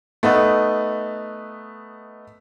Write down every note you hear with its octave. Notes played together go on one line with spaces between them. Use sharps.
A3 B3 D#4